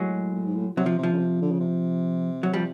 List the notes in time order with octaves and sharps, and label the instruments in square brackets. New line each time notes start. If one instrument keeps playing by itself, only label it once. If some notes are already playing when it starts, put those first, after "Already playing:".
Already playing: [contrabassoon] A2 [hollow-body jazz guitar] F#3 G#3
[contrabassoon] A2
G#2
A2
[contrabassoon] C3 [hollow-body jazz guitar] F#3
[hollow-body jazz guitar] F3
[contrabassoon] C3
[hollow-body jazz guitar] F3
[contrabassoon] C#3
C3
D3
C#3
C3
[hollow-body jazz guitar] F#3
F3 G3